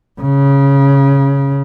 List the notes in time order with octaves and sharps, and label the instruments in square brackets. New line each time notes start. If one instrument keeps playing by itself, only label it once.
[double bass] C#3